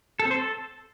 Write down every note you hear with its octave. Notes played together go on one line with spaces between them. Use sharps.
A4
C4
C5
A4